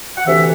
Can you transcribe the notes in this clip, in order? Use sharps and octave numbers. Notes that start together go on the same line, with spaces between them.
F#5
D2 C3 E3 E5